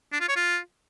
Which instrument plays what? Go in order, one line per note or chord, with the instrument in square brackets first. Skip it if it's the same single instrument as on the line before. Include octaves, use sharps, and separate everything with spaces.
[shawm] D4
F4
C#5
F4